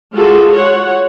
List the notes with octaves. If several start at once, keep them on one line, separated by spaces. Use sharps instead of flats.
G#3 F4 F#4 G#4 A4
C#5 F#5